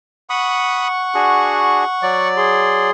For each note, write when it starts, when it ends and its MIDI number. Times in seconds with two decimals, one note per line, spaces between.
0.30 2.28 78
0.30 0.88 83
0.30 2.28 85
0.30 0.88 87
1.15 1.84 62
1.15 1.84 66
1.15 1.84 68
2.02 2.90 54
2.02 2.90 74
2.37 2.91 68
2.37 2.91 84